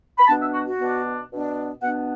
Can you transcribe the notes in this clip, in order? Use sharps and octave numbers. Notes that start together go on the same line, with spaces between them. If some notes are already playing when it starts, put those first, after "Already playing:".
B5
B2 B3 D4 A5
E5
F#4
F#4
B2 B3 D4
B2 B3 D4
B2 B3 D4 F#5